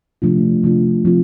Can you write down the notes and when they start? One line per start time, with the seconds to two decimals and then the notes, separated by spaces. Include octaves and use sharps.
0.22 C3 F3 A3 D4 F4
0.63 C3 F3 A3 D4 F4
1.05 F3 C4 F4